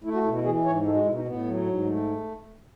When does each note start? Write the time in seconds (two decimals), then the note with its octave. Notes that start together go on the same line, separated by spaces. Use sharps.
0.04 A3 E4
0.14 F#4
0.24 B2 E4
0.35 E4
0.44 E3 G#4
0.65 G#2 C#5
0.85 G#3 A4
0.95 F#4
1.05 B2 E4
1.15 D#4
1.25 A2 B3
1.46 F#3
1.66 G#2
1.86 A3